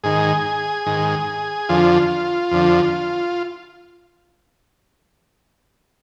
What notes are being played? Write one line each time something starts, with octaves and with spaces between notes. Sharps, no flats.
G#2 D#3 G#4
G#2 D#3
F2 D3 F3 F4
F2 D3 F3